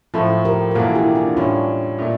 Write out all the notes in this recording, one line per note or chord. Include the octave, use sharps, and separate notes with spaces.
A2 F3 A3 F4 A4
G4 A#4
A#4
E1 E2 E3 A#3 F4 A4
E4 G4
D4 F4
A2 G3 C#4 D4 F4
A#2 A3 D4